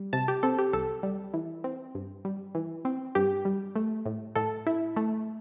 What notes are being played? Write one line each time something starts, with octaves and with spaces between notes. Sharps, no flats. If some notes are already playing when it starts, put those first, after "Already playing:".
Already playing: G3
C3 A5
G4
C4 A4
G4
C2 A4
G3
E3
C4
G2
G3
E3
C4
G2 G4
G3
A3
A2
A2 A4
E4
A3